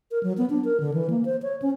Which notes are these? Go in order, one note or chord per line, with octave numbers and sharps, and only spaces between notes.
A#4
F#3
B3
D4
A#4
D3
E3
A#3
C5
C#5
C#4